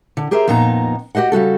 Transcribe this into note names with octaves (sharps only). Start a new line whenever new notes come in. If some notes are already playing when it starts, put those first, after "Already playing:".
D3
G4 G#4 A#4 C5 E5
F2 A#2 B3 D#4 A4 A#5
F#4 G4 C5 D#5 F#5
C#3 G3 F#4 A4